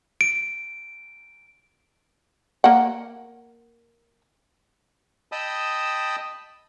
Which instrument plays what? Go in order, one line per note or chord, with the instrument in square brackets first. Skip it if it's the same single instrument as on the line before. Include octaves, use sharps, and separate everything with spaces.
[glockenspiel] D7
[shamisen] A#3 F#5
[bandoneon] D#5 G5 A5 B5 D#6 E6